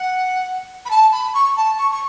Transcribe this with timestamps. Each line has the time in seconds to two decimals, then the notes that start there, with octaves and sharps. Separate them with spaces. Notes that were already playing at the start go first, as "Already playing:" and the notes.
Already playing: F#5
0.85 B5
0.91 A5
1.12 B5
1.34 C#6
1.57 A5
1.78 C#6
1.91 C#6